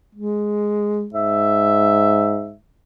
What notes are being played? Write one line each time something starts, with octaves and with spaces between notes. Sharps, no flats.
G#3
G#2 E5